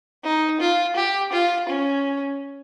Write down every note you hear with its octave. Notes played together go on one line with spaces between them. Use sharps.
D#4
F4
G4
F4
C#4